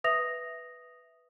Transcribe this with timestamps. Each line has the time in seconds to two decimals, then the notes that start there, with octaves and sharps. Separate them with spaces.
0.04 B4 E5 D#6 A#6 F7